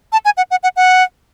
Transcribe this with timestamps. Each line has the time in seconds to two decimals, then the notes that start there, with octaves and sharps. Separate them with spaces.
0.12 A5
0.25 G#5
0.37 F#5
0.51 F#5
0.63 F#5
0.76 F#5